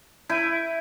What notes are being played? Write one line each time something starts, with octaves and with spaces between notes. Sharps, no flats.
E4 G6 D#7